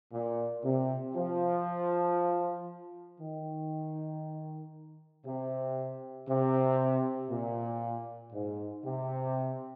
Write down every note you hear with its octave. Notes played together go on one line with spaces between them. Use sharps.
A#2
C3
F3
D#3
C3
C3
A#2
G#2
C3